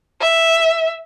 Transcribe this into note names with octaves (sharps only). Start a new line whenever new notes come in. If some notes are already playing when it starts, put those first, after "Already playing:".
E5